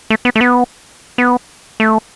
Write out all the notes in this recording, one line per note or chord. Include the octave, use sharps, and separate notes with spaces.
A3
B3
A3
B3
B3
A3